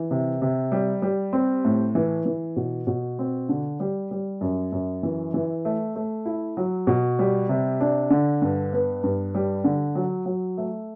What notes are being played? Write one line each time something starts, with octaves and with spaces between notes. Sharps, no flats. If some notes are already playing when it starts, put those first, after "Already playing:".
Already playing: E3
C3
C3
G3
G3
C4
A2
E3
E3
B2
B2
C4
D3
G3
G3
F#2
F#2
E3
E3
A3
A3
E4
F#3
B2
G3
C3
D4
D3
G2
B3
G2
G3
D3
F#3
F#3
A3